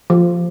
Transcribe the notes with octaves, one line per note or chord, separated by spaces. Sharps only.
F3